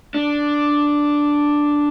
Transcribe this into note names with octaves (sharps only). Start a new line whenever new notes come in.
D4